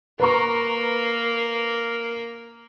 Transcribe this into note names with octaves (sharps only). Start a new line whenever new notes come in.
A#3 A#4 B4 A#5 C#6